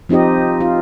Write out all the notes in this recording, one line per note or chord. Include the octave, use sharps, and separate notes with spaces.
F3 C4 D#4 G4 D#5
F4